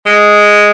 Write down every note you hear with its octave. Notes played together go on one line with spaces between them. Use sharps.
G#3